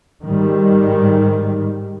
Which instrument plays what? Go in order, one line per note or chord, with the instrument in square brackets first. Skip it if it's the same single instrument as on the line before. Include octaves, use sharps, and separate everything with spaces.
[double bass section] G#2 D#3 G3